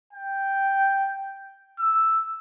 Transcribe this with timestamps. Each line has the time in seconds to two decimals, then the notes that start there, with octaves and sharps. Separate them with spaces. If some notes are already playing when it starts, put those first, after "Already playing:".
0.13 G5
1.79 E6